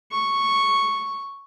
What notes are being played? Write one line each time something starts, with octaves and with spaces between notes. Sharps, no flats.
C#6